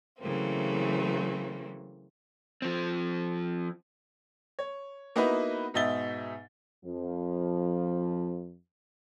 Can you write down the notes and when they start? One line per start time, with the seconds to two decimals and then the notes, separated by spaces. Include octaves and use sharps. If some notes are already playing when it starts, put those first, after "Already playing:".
0.20 C#3 E3 F#3 A3 A#3 C4
2.62 F3 C4
4.59 C#5
5.16 A#3 B3 D#4 E4 F#4 B4
5.74 G#2 B2 D#4 E5 A6 G7
6.85 F2 F3